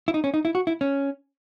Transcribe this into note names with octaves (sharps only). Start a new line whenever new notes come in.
E4
D#4
C#4
D#4
E4
F#4
E4
C#4